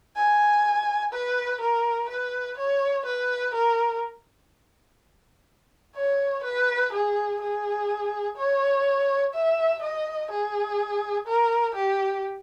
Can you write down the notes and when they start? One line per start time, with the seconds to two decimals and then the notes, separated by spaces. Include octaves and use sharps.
0.16 G#5
1.13 B4
1.61 A#4
2.09 B4
2.58 C#5
3.06 B4
3.54 A#4
5.96 C#5
6.44 B4
6.93 G#4
7.41 G#4
8.37 C#5
9.34 E5
9.82 D#5
10.31 G#4
11.27 A#4
11.75 G4